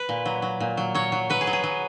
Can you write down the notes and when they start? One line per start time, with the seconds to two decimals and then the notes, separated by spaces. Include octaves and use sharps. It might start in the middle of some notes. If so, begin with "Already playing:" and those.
Already playing: B4
0.09 A#2
0.26 F#3
0.42 F#3
0.60 A#2
0.77 F#3
0.95 F#3 C#5
1.12 F#3
1.30 F#3 B4
1.41 G#4
1.47 F#3
1.53 G#4
1.64 F#3